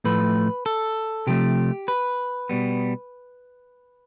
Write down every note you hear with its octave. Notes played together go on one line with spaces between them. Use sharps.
A2 F3 A3 B4
A4
C3 F3 A3 G4
B4
B2 G3 B3